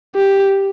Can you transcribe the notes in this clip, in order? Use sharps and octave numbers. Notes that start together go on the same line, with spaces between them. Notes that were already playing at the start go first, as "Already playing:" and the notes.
G4